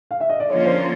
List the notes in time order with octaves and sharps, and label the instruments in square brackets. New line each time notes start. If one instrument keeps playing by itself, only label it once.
[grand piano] F5
E5
D#5
D5
[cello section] D3 F3 A#3 C#4 F4 [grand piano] C#5
[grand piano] C5